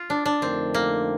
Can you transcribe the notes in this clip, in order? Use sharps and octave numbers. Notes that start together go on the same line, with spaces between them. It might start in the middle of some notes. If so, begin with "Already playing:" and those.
Already playing: F4
D4
D4
F2 D3 A3 C4 D#4 A#4
A#3